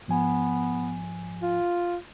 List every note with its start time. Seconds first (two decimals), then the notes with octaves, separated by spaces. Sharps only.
0.08 G#2 F3 B3 G#5
1.42 F4